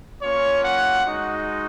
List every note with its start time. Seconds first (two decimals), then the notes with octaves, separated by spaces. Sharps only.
0.23 A#3 C#4 F4 C#5
0.63 F#5
1.02 G#3 D#4 F#4